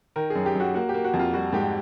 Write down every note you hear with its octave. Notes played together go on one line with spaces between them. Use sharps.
D#3 A#4
F#2 G#4
G4
F#2 F#4
A#3 F#4
G4
A#3
F#4
F2
F4
G3 F#4
G#2 G4